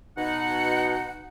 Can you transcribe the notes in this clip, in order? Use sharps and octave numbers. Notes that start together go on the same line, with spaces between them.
B2 D#4 F#5